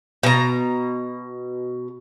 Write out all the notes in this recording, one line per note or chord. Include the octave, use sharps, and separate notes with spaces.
B2 A#5